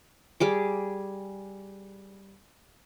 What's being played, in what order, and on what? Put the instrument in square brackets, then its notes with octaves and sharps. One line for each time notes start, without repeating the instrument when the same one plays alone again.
[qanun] G3 G#4 D6